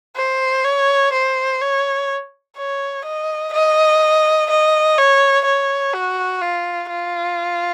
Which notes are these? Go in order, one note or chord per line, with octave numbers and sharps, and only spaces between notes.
C5
C#5
C5
C#5
C#5
D#5
D#5
D#5
C#5
C#5
F#4
F4
F4